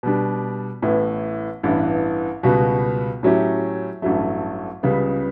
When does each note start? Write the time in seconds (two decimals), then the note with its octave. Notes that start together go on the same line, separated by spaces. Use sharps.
0.03 B2 G3 D4
0.82 A1 A2 E3 B3 E4
1.63 A1 G2 E3 B3
2.43 C#2 B2 G3 B3 F#4
3.23 A2 F#3 C#4 E4 G4
4.02 A1 G2 F#3 A3
4.83 C#2 C#3 G3 B3